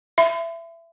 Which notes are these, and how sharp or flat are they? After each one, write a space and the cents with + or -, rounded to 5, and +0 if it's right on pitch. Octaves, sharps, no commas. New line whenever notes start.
E5 +20 C6 -45